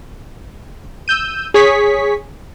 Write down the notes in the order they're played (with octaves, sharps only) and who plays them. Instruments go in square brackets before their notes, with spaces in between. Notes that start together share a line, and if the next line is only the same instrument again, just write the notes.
[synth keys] E6 G6 D#7
G#4 C#5 C#6 B6